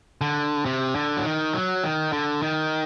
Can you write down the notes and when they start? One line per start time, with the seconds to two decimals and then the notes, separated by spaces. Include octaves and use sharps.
0.21 D3
0.65 C3
0.95 D3
1.17 F#3
1.25 D#3
1.54 F#3
1.83 D#3
2.13 D3
2.42 D#3